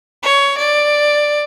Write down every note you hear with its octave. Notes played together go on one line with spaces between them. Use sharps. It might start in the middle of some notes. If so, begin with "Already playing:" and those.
C#5
D5